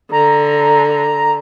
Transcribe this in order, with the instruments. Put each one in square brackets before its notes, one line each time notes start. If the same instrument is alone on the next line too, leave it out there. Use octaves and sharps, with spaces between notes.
[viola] D3 [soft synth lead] A#5